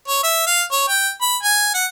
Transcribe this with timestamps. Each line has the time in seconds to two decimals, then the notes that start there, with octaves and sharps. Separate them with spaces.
0.08 C#5
0.24 E5
0.47 F5
0.72 C#5
0.88 G5
1.22 B5
1.43 G#5
1.75 F#5